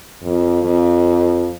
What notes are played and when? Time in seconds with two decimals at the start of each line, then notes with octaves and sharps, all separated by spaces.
0.24 F2
0.63 F2